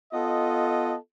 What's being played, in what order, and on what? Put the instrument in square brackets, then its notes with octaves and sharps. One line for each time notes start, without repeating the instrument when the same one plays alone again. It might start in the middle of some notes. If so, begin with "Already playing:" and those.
[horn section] B3 F4 A4 D#5